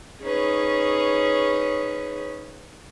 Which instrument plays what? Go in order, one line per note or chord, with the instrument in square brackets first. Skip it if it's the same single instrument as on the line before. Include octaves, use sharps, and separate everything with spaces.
[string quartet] C#4 D#4 G#4 B4 C#5